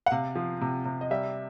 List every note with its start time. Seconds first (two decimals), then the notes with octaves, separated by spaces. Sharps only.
0.06 F#5
0.11 C3 F5
0.35 F3
0.61 C3
0.85 C3
1.01 D#5
1.10 G3 E5